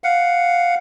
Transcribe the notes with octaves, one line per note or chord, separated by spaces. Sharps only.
F5 F#5